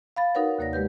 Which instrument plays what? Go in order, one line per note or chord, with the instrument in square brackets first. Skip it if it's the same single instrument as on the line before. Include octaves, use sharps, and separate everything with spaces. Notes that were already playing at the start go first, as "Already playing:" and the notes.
[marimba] F5 B5 A6
D#4 F#4 A#4 B4 C#5 F#5
D#2 C3 A#3 C#5 D5 A#6
G#3 G4 B4 G6